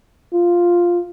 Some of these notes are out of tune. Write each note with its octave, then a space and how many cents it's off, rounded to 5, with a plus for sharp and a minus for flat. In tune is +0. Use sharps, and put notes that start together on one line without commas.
F4 +0